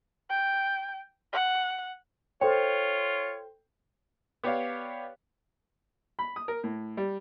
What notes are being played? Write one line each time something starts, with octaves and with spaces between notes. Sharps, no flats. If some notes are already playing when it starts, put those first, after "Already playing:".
G5
F#5
F4 A4 C5 C#5 G5
B3 G4 C#5 D5 F5
B5
D#6
A#4
A2
G3